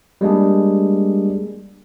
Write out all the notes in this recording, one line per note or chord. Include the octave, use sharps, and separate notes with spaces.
G3 G#3 A#3 D4 G#4